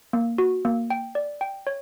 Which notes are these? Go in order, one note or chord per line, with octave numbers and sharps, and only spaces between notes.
A#3
F#4
A#3
G5
D5
G5
C#5